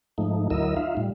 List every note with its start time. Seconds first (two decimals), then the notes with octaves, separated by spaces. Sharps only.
0.18 G#2 F3 A3 D#4
0.50 D2 F#3 E4 A#4 D#5 E6
0.76 D#4 F4 E5 F5
0.97 A2 G3